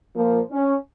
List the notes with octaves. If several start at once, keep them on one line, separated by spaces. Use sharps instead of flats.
A#2 F3 A#3
C#4